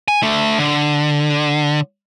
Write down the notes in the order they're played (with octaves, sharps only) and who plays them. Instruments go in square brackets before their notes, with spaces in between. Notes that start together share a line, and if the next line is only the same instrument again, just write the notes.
[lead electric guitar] G#5
D3 A3
D3